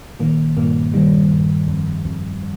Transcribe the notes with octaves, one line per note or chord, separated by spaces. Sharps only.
A#2 D#3 A#3
G2 A#2 A#3
D#3 G3
G2
F2
F2